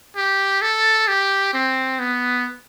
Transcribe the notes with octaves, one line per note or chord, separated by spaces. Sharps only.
G4
A4
G4
C4
B3